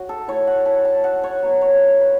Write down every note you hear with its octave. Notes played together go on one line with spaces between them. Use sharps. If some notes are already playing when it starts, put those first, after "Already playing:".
Already playing: F#3 C#4 F#4
A4
A3 E4 C#5
F#5
A5
A5
F#5
C#5
F#3 B3 E4
C#5
B4